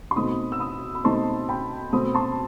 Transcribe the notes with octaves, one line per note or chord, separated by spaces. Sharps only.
C6
B2 A3 C4 D#4 B5 D#6
E6
B5 D#6
B5
B2 A3 C4 D#4 A5 C6
G5 B5
B2 A3 C4 B5 D#6
A5 C6